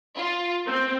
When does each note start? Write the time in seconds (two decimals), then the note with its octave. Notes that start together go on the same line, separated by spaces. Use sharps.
0.16 F4
0.67 C4